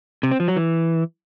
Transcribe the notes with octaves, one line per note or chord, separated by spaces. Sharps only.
C3
C4
F3
F#3
E3